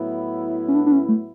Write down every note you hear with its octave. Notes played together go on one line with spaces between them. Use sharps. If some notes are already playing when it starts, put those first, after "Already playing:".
Already playing: A2 F#3 B3 E4
C#4
D4
D4
C#4
A3